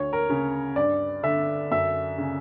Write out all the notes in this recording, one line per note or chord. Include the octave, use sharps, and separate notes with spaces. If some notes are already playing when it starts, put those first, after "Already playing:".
Already playing: D2 C#5
A#4
C#3
G2 D5
D3 E5
F#2 E5
C#3